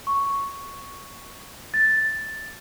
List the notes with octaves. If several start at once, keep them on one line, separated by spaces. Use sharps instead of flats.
C#6
A6